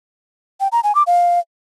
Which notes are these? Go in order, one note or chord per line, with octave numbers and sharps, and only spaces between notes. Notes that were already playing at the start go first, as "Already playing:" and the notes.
G5
A#5
G#5
D6
F5